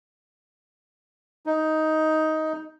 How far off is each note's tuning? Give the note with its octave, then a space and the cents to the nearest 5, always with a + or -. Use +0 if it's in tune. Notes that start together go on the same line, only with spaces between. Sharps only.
D#4 +10